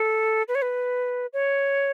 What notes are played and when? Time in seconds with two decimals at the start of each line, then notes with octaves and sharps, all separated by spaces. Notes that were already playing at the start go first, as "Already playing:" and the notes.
Already playing: A4
0.48 B4
0.55 C#5
0.62 B4
1.33 C#5